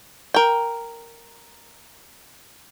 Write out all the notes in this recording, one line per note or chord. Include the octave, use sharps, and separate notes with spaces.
A#4 G5